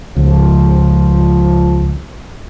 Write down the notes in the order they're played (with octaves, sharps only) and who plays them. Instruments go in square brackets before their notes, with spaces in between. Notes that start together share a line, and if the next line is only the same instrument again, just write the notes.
[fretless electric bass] C#2 [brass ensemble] F3